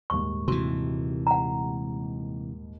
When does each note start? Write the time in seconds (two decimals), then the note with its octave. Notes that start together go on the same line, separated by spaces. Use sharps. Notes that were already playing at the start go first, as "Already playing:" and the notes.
0.10 D#1 D#2 G#2 C#6
0.48 C3 E3 F#4
1.27 F#5 A#5